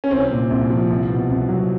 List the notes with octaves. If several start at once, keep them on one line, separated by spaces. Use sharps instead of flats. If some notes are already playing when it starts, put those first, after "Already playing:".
C#4
C2 C4
A#2
C2
F3
C2
B2
C2
F#3